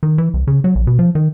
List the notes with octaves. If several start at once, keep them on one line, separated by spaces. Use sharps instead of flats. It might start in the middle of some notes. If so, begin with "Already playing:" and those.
D#3
E3
C2
C#3
F#3
A#1
B2
F3
D#3